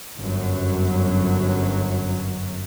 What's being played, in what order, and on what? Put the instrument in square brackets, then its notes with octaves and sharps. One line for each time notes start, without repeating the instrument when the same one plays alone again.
[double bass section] G1 F#2 F#3